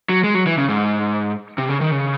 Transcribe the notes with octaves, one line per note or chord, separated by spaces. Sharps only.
F#3
G#3
F#3
E3
C#3
G#2
C3
C#3
D#3
C#3